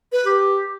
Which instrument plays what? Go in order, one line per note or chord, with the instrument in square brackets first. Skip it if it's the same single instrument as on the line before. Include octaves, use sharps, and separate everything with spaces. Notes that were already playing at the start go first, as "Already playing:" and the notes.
[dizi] B4
[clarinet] G4